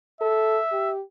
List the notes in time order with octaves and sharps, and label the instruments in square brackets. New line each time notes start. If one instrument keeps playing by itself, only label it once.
[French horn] A4 [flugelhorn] E5
[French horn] G4